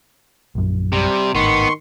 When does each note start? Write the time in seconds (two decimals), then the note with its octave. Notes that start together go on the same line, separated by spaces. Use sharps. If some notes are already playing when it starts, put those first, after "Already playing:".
0.55 A#1 F#2
0.92 C3 G3
1.35 G#1 A2 D#3 B3 C6 C#6